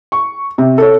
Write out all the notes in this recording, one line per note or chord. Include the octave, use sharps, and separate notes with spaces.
C#6
C3
A4 C#5